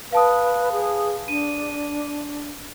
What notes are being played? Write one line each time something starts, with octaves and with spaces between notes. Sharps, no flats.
B4 F5 A5 D#6
G#4
D4 D#7